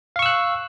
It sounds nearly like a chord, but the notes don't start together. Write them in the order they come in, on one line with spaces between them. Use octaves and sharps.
F5 C#6 E6 F#6